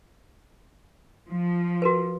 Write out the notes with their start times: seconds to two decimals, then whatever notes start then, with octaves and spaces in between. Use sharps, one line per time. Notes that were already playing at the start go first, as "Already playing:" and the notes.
1.31 F3
1.82 F#4 A#4 B4